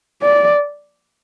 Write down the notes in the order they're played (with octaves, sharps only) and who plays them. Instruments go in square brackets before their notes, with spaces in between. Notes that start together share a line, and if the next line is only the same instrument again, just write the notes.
[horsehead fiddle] D5